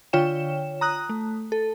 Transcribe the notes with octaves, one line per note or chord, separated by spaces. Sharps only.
D3 F4 C#5 G5 E7
A#5 D#6 F#6
A3
A4